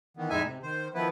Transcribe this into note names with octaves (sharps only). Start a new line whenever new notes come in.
D#3 E3 B3
F2 A2 G#3 D#4 E5 G#5
C3
D#3 C5
D#3 F3 B3 E4 B4